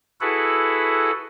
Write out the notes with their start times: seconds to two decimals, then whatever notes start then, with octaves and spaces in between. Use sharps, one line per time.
0.21 E4 F#4 G#4 A4 B4 F#5